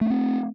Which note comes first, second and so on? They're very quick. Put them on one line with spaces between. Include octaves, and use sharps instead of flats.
A3 C#4 C4